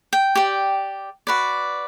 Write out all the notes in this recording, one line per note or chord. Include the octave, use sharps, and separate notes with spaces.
G5
G4 D5
F#4 B4 D5